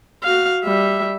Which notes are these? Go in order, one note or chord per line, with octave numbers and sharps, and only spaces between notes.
F#4 F5
G3 E5